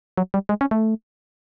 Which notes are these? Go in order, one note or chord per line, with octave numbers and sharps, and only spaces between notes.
F#3
G3
G#3
C#4
A3